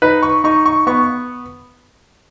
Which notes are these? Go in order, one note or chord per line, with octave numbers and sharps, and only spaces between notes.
D#4 B4
C#6
D#4 C#6
C#6
B3 C#6